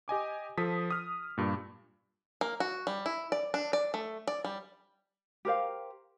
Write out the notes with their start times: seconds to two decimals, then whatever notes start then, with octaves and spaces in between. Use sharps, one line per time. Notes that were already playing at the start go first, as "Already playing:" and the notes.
0.08 G4 D#5 G#5 D6
0.57 F3 A4 D#6 B6
0.90 D#6 F6
1.38 G2 A#2
2.41 A#3
2.60 F#4
2.87 G3
3.06 E4
3.32 D5
3.54 D4
3.73 D5
3.94 A3
4.27 D5
4.44 G3
5.45 G4 A#4 C5 F5